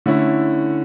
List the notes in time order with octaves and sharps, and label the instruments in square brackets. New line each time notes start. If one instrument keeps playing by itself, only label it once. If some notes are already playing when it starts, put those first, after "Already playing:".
[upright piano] D3 A3 C#4 E4